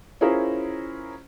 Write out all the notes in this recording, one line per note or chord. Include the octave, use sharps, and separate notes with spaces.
C#4 E4 F4 G#4 A#4 C5